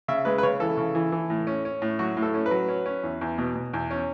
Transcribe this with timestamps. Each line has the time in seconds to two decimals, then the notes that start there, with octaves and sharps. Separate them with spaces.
0.08 C#3 E5
0.25 G#3 B4
0.38 B4
0.43 C#3 C#5
0.60 E3 A4
0.77 C#3
0.95 E3
1.12 E3
1.30 A2
1.47 C#4
1.65 C#4
1.82 A2
1.99 F#3 F#4
2.17 A2
2.22 A4
2.34 C#4
2.46 B4
2.51 F#3
2.69 C#4
2.86 C#4
3.03 E2
3.21 E2
3.38 B2
3.55 B2
3.73 E2
3.91 C#4